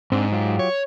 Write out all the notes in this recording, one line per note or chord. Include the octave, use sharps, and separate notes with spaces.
G#2 C4 D4
F#3 F4 G4
C#5